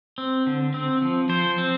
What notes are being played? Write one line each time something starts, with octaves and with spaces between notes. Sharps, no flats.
C4
D3
C4
F3
F3 C5
C4